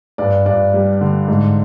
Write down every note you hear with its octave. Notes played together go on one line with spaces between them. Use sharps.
G2 D5
G2 D5
G3
D3
G#2